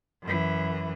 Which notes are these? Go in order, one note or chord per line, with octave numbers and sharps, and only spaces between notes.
F#2 E3